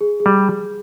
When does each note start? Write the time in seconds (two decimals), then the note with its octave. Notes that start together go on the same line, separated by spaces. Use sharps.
0.01 G#4
0.20 G#4
0.26 G3